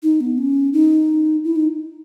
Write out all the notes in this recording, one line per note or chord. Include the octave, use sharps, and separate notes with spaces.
D#4
B3
C#4
D#4
E4
D#4